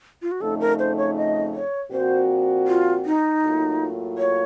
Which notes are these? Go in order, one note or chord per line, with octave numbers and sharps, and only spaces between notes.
F4
F#4
F2 C#3 A3 D#4 A4
A#4
C5
C#5
D#5
C#5
A#2 F3 C4 F#4 C5
F4
D#4
A2 F#3 A#3 F4
C#5